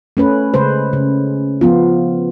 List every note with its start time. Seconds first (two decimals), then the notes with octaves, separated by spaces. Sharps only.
0.17 A3 C#4 B4
0.54 C#3 G#3 B4 C5
0.93 C#3
1.61 F3 B3 F4